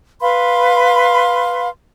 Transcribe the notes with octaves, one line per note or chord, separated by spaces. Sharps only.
B4 F5 B5 C6